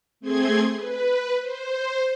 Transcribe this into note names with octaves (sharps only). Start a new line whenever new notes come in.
A3 C4 G#4 C6 G#6
B4
C5